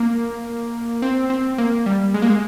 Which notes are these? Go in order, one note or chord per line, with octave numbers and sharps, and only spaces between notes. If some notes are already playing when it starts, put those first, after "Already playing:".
Already playing: A#3
C4
C4
A#3
G3
G#3
A#3
G#3